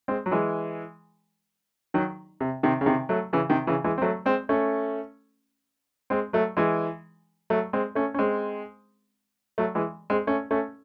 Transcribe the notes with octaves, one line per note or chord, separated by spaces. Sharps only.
G#3 C4
F#3
E3 G#3
D#3 F#3
C3
C3 D#3
C#3
C3 D#3
F#3 A3
C#3 E3
C3 D#3
C#3 E3
E3 G#3
C4
F#3 A3
G#3 C4
A3 C#4
G#3 C4
F#3 A3
E3 G#3
F#3 A3
G#3 C4
A3 C#4
C#4
G#3 C4
F#3 A3
E3 G#3
G#3 C4
A3 C#4
A3 C#4